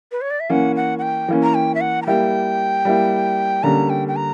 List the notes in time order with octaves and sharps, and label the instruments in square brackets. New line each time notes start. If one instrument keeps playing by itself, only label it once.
[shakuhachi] B4
C#5
D5
E5
[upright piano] E3 A#3 C#4 [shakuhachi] F#5
[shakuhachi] F#5
F#5
G5
[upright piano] E3 A#3 C#4
[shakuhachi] A#5
G5
E5
F#5
A#5
[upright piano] G3 A#3 E4 [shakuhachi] G5
[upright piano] G3 A#3 E4
[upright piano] D3 G3 A#3 C#4 [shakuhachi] A#5
[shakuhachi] G5
G5
A#5